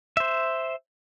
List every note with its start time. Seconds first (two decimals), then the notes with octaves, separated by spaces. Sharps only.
0.17 C5 E5